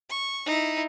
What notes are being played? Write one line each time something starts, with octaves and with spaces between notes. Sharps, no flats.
C#6
D#4 E4